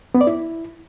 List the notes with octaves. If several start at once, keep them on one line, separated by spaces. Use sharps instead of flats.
B3
D5
E4